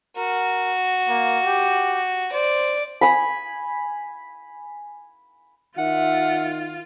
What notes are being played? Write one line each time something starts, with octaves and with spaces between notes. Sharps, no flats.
F#4 A#4
A#3
G4
C5 D5
G#5 B5
D#3 F4 E5 F#5